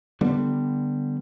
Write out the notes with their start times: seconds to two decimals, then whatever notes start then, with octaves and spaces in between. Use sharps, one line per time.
0.21 D3 G3 B3